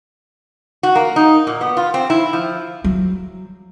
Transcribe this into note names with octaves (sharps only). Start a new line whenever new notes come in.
F#4
A#3
D#4
A#2
B3
F4
C4
E4
F3
F#3